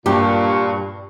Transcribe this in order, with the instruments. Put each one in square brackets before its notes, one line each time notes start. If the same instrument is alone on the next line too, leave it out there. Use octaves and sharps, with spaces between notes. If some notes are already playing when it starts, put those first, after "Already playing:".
[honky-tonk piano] G2 [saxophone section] A#2 [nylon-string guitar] G4 [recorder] C#6